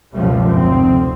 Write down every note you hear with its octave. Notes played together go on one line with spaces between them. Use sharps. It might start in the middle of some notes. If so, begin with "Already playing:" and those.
C#2 F#2 B2 F3 G3 A3
F1 D2 C4